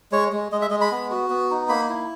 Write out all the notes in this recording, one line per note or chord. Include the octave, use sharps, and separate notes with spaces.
G#3 C#5
G#3
G#3 D#5
E5
G#3 D#5
B5
B3
F#4
B3
D#4
A#3 B5
E4